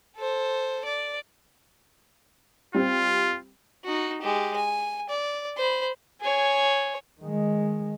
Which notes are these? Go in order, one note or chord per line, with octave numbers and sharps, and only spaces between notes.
A4 C5
D5
G3 C4 F4
D#4 F#4
G#3 G4
G#5
D5
C5 B5
G#4 C#5
D#3 G#3